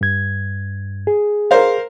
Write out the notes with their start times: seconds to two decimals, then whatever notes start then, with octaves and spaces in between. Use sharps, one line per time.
0.01 G2 G#6
1.07 G#4
1.51 A#4 C5 F5